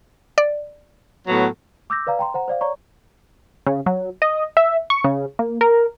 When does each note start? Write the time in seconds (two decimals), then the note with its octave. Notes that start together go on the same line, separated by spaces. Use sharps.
0.38 D5
1.28 A2 F#3 B3
1.90 D6 E6 G6 A#6
2.07 B4 D5 F5 A#5
2.19 G5 A#5 C6
2.34 C5 F#5 A#5
2.48 C5 D5 F5
2.61 C#5 D5 A#5 C#6
3.66 C#3
3.86 F#3
4.22 D#5
4.57 E5
4.90 C#6
5.04 C#3
5.39 A#3
5.61 A#4